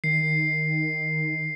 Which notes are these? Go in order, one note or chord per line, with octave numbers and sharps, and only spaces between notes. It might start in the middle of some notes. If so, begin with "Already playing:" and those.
D#3 C7